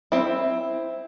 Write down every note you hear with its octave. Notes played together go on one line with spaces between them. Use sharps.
C4 E4